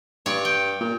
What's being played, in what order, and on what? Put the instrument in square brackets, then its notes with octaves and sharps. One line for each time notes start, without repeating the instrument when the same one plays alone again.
[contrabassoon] G2 [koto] C#5 D5
[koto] G5
[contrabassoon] A#2